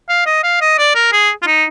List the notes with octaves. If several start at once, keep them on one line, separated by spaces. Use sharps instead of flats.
F5
D#5
F5
D#5
D5
A#4
G#4
F4
D#4